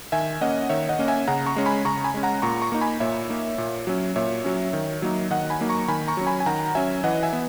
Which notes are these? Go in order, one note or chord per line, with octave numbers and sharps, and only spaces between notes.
D#3 E5 G#5
A#3 C#4 D#5 F#5
D#3 C#5 E5
D#5 F#5
A#3 C#4
E5 G#5
C#3 F#5 A#5
A#5 C#6
G#3 C#4
G#5 B5
C#3 A#5 C#6
G#5 B5
G#3 C#4
F#5 A#5
A#2 A#5 C#6
A#5 C#6
A#3 D#4
G#5 B5
A#2 C#5 E5
A#3 D#4
A#2
F#3 C#4
A#2 C#5 E5
F#3 C#4
D#3
F#3 A#3 D#4
D#3 D#5 F#5
G#5 B5
F#3 A#3 D#4
A#5 C#6
D#3 G#5 B5
A#5 C#6
F#3 C#4
G#5 B5
G#5
D#3 F#5 A#5
F#3 C#4 E5 G#5
E3 D#5 F#5
E5 G#5
B3